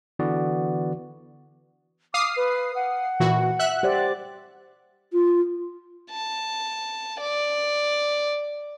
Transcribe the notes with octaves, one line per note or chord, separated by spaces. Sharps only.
D3 E3 B3 F#4 D5
F5 D6 D#6 C7
B4
F#5
A#2 E3 F#4
E5 F#6
G4 C5 D5
F4
A5
D5